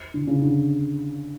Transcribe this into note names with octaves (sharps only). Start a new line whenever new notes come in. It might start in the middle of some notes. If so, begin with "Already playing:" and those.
D3
C#3
D3